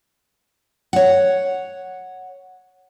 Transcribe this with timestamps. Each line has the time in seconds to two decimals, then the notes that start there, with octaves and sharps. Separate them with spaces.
0.93 C#5 F#5